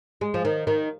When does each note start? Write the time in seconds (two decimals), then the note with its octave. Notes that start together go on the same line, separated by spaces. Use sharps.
0.21 G#3
0.34 F3
0.45 D#3
0.67 D#3